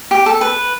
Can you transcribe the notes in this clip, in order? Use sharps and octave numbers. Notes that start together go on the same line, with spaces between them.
G4
A4
B4